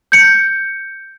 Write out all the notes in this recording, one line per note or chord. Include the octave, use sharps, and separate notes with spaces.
G6 C#7